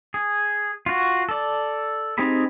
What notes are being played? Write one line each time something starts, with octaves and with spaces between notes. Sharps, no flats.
G#4
F4 F#4
A4 D5
C4 D#4 G4 G#4 B5